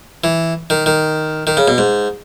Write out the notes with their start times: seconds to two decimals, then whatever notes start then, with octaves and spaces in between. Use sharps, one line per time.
0.24 E3
0.70 D#3
0.86 D#3
1.47 D#3
1.57 C#3
1.68 B2
1.78 G#2